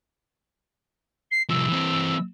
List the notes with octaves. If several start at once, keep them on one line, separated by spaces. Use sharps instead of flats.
C7
C2 F3 E6
E3 C4